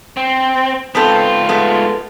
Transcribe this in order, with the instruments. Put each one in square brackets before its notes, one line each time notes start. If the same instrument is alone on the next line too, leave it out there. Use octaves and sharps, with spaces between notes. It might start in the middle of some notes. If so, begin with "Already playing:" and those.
[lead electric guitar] C4
[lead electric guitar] G#2 F4 [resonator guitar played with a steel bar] B3 C4 A4
[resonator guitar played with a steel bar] G#3 A3 B3